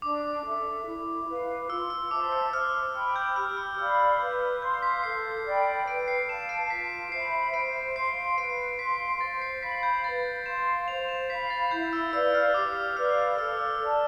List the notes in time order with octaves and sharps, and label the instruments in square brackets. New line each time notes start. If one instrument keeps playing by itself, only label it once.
[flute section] D4 [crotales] D6
[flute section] A4 E5
E4
B4 F5
[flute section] F4 [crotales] E6
[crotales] E6
[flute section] C5 E5 A5 [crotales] D6
[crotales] E6
[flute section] C5 [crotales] F6
[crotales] F6
[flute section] G5 B5 [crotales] F6
[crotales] G6
[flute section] G4 [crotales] F6
[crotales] E6
[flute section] D5 F5 B5 [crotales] E6
[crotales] F6
F6
[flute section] B4 [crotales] G6
[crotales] F6
[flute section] F5 C6 [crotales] G6
[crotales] B6
[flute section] A4 [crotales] C7
[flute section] D5 G5 B5
[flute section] B4 [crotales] D7
[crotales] C7
[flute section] F5 A5 [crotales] E7
[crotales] D7
[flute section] F4 [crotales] B6
[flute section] C5 E5 B5 [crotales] C7
[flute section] C5 [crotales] D7
[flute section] F5 C6 [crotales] C7
[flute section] B4 [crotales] D7
[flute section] F5 C6 [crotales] B6
[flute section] C5 [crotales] A6
[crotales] C7
[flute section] F5 B5 [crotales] B6
[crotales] G6
[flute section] B4 [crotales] A6
[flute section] F5 C6 [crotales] E7
[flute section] C5 [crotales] F7
[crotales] E7
[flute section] F5 B5 [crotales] B6
[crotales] A6
[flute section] E4 [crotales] G6
[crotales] E6
[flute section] B4 D5 F5 [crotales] E6
[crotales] F6
[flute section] G4 [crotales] D6
[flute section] B4 D5 F5 [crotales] F6
[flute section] A4 [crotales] E6
[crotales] E6
[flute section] D5 A5